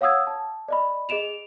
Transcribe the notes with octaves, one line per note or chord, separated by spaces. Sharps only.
C#5 F5 F#5 D#6 E6 G#6
A5
D5 D#5 B5
G#4 D#5 D7 E7 F7